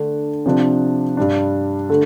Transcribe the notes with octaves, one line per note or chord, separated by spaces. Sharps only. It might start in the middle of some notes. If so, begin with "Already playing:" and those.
Already playing: D3 A3 D4
C3 F3 D4
G2 G3 D4
D3 A3